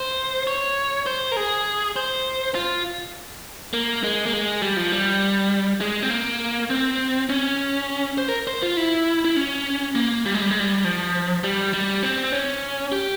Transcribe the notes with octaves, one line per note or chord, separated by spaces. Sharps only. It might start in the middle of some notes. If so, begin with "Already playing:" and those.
Already playing: C5
C#5
C5
A#4
G#4
C5
F4
A#3
G#3
A#3
G#3
G3
F3
G3
G#3
C4
A#3
C4
C#4
C5
A#4
C5
F4
E4
E4
C#4
A#3
G3
G#3
G3
G#3
G3
F3
G3
G3
C4
C#4
G4